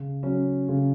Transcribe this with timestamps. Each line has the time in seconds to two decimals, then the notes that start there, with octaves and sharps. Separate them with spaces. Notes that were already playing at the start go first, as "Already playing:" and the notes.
Already playing: C#3
0.23 F#3 C#4
0.69 C#3